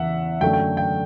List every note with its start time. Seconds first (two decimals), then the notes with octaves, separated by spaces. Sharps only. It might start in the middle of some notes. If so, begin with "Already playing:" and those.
Already playing: E2 C#3 E3 E5 F#5
0.41 F#2 D3 F#3 A3 G5
0.53 G5
0.77 G5